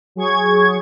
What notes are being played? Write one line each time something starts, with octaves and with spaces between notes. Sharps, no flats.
F#3 G#4 C#6 G#6